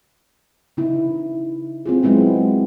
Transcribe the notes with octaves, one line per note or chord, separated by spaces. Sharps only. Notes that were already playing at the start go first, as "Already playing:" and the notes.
C#3 D#4 E4
C4 F4 G#4
F#3 G#3 B3 C4 E4